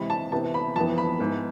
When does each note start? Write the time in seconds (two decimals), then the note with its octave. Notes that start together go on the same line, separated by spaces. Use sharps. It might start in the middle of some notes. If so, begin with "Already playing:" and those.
Already playing: C3 E3 G#3 C4 B5
0.10 A5
0.32 C3 E3 B3 A5
0.54 B5
0.76 F2 E3 B3 A5
0.98 B5
1.19 G#2 E3 B3